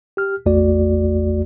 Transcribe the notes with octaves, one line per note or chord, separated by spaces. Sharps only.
G4 F6
A1 E2 A3 F#4 D5